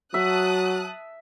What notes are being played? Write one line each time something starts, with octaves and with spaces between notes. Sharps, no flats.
F#3 F#4 E5 A5 D#6 F#6